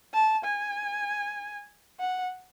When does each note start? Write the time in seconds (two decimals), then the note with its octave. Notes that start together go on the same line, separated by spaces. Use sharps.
0.14 A5
0.44 G#5
2.00 F#5